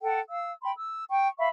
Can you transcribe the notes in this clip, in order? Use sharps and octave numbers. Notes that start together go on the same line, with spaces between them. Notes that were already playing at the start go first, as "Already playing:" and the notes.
A4 F#5 G5
F5 E6
G5 B5 C6
E6
G5 C#6
E5 F5 B5 C#6